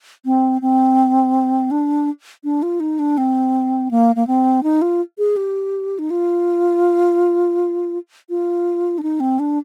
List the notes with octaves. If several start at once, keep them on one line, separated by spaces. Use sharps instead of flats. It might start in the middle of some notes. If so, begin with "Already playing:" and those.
C4
C4
D4
D4
F4
D#4
D4
C4
A#3
A#3
C4
D#4
F4
G#4
G4
D#4
F4
F4
D4
D#4
C4
D4